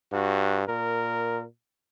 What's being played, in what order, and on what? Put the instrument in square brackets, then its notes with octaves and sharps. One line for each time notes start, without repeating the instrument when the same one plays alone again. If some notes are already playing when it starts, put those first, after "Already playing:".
[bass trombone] G2 [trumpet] F#4
[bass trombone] A#2 [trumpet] A#4